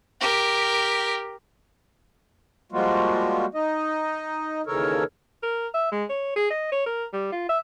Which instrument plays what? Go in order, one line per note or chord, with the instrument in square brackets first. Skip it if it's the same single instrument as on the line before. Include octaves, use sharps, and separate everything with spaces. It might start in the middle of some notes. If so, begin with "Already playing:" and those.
[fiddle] G4 A#4
[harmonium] F3 G3 G#3 A#3 F4 F#4
D#4 D#5
D#2 C#3 E3 A4 A#4 C#5
[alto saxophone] A#4
E5
G#3
C#5
G#4
D#5
C#5
A#4
G3
F4
E5